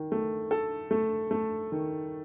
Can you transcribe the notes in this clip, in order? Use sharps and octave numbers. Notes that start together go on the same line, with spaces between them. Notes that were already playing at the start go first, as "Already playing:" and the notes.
Already playing: D#3
A3
A4
A3
A3
D#3